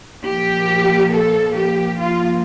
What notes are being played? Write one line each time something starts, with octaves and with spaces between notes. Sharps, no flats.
A#2 F3 A#3 G4
A4
G4
G2 F3 A#3 F4